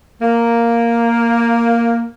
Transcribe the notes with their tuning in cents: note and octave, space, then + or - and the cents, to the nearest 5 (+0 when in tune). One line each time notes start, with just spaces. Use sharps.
A#3 +0